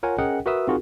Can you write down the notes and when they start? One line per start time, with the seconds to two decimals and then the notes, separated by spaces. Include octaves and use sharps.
0.03 F4 A#4 C#5 F#5 G#5
0.18 C#4 G#4 A#4 D#5 F#5 G5
0.46 F#4 A#4 B4 E5 D#6 E6
0.67 C4 D#4 F4 F#4 G#4 A#4